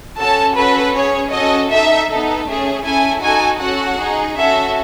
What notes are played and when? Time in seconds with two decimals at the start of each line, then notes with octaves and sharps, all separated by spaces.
0.18 C#4 F#4 A4 A5
0.56 C#4 F#4 A4 B4
0.94 C#4 G#4 C#5
1.33 C#4 F#4 A4 D#5
1.71 D#4 A4 E5
2.09 B3 D#4 A4
2.47 A3 C#4 G#4
2.85 C#4 E4 A4 G#5
3.22 D#4 F#4 A4 G#5
3.61 C#4 F#4 A4 F#5
3.99 D#4 G#4
4.38 C#4 F#4 A4 E5